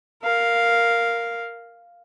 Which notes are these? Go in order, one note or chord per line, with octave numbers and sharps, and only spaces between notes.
A#4 F5